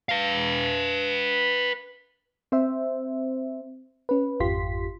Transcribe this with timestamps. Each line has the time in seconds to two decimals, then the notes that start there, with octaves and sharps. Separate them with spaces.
0.09 B4 F5
2.52 C4 C5 E5
4.09 C#4 B4
4.40 G#1 F2 F4 G4 C6 B6